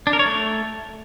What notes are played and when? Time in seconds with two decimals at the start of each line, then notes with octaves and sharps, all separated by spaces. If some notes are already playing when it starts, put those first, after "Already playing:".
0.07 D4
0.13 A#4
0.19 C#5
0.26 A3